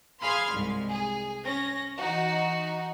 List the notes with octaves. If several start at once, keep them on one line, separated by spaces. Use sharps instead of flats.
G#4 F5 B5 C6 F6 G#6
C2 G#2
G#4
C#4 A#6
E3 D#4 F#4